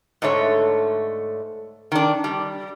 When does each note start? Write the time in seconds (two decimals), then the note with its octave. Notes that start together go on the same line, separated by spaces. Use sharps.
0.22 G#2 D3 A3 C#5
1.92 D#3 D4
2.24 G3